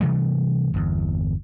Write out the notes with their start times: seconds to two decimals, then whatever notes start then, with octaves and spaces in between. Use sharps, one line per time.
0.01 C3 E3 G3 A3
0.74 G1 E2